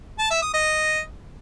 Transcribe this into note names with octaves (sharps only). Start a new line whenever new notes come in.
A5
E5
D#6
D#5